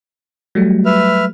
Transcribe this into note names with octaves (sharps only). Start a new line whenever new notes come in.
F#3 G3 A3
B4 E5 F6